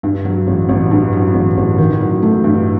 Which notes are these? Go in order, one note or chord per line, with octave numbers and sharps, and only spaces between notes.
G2
F#3
A1
A1
G2
F#3
A1
A1
D#3
F#3
A3
G2